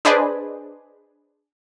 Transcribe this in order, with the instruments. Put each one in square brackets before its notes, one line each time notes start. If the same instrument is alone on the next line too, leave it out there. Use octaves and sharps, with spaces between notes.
[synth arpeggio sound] D4 G#4 B4 C5 D5 D#5